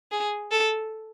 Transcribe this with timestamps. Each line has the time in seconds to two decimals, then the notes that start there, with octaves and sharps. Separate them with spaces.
0.12 G#4
0.51 A4